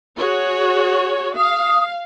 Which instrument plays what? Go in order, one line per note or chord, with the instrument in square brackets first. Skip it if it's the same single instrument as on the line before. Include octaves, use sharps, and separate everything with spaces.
[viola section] F#4 G#4 C#5
[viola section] F5 [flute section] D#6